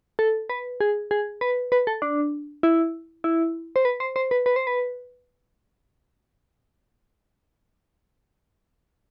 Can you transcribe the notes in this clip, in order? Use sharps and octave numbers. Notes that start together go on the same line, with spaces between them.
A4
B4
G#4
G#4
B4
B4
A4
D4
E4
E4
C5
B4
C5
C5
B4
B4
C5
B4